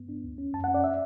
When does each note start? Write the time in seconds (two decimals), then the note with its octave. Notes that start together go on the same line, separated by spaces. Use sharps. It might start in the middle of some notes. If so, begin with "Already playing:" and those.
Already playing: G2 B3
0.09 D4
0.24 D2
0.38 C#4
0.53 F#2 A5
0.64 F#5
0.68 C#4
0.74 D5
0.84 E5